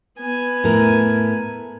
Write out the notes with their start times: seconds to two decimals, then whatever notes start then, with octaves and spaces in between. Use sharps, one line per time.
0.19 B3 G#5
0.64 A2 A#4